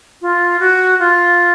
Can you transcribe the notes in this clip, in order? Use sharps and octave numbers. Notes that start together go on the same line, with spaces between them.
F4
F#4
F4